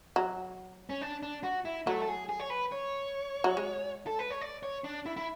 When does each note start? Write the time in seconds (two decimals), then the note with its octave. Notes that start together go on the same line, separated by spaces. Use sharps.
0.16 F#3
0.90 C#4
1.01 D4
1.23 D4
1.43 F#4
1.65 E4
1.87 F#3 A3
2.02 A4
2.08 G#4
2.29 G#4
2.40 C#5
2.50 B4
2.72 C#5
3.44 F#3
3.57 G#3
4.07 A4
4.19 B4
4.31 C#5
4.41 D5
4.63 C#5
4.84 D4
5.06 E4
5.17 E4